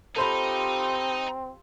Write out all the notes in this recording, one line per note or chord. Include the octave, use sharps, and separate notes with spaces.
C4 D#4 F4 G4 A4 C5 B5